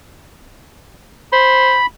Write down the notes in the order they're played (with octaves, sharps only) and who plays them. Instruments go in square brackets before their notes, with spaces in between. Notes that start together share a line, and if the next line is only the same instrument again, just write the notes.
[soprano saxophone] C5 [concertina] B5